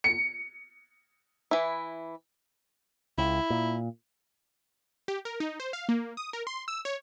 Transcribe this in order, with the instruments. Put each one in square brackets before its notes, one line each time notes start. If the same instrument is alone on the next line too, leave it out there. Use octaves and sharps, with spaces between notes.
[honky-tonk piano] C#7
[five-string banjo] E3 E4
[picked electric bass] C#2 [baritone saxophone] E4
[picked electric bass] A#2
[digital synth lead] G4
A#4
D#4
C5
F5
A#3
D#6
A#4
C6
E6
C#5